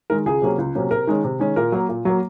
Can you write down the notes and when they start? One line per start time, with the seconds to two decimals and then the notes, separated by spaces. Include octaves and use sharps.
0.10 D#3 G#3 A#4
0.26 C#2 G#4
0.42 C3 F#3 A#3 C#4
0.58 C#2
0.75 C3 F#3 A#3 C#4
0.91 C3 A#4
1.07 D#3 G#3 C#4
1.24 C3
1.40 D#3 G#3 C#4
1.56 A#2 A#4
1.72 F#3 A#3
1.89 A#2
2.05 F#3 A#3